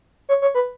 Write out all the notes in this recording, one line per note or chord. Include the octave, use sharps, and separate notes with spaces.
C#5
C#5
B4